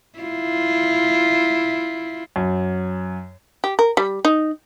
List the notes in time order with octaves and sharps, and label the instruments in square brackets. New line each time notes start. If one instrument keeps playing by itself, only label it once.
[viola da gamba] E4 F4
[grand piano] F#2
[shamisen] G4
A#4
G3
D#4